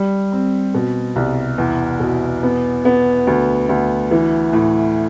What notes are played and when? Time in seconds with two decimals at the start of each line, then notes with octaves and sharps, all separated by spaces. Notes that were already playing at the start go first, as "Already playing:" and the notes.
Already playing: G3
0.32 C4
0.75 B2
1.16 C2
1.58 E2
2.00 B2
2.43 B3
2.85 B3
3.27 D2
3.69 D2
4.11 E3
4.53 A2